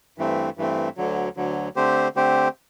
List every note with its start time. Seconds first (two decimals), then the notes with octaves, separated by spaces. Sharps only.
0.18 G2 E3 A3 C4
0.57 G2 E3 A3 C4
0.97 D2 D3 F#3
1.37 D2 D3 F#3
1.76 D3 A3 C4 G4 C5
2.16 D3 A3 C4 G4 C5